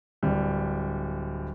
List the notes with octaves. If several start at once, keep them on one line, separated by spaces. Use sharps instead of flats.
D1 G3